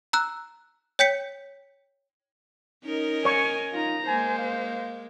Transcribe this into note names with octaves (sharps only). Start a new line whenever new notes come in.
A#5 E6 F#6
C#5 G5 G6 B6 C#7
C#4 D#4 A#4 D#5
C#5 G#5 C#6
D#4 F4 A#5
G#3 A#3 C5 G#5
F5